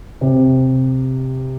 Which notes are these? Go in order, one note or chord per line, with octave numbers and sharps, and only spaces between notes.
C3